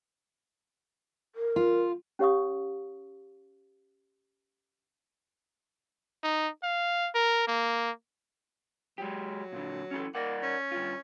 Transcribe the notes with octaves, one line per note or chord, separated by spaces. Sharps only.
A#4
F4
C#4 G4 C#5 F5 C#6 D#6
D#4
F5
A#4
A#3
F#3 G#3 G4
A#2 D3
C#4 E4 A4
A#3 A#4 D5 F#5
C#4
G2 F4